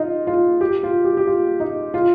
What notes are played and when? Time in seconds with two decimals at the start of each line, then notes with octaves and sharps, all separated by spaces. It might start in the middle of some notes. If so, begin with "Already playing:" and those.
Already playing: D#4 F4
0.27 F4
0.61 G4
0.83 F4
1.04 G4
1.17 G4
1.27 F4
1.60 D#4
1.94 F4